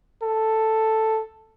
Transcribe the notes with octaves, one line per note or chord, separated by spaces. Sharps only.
A4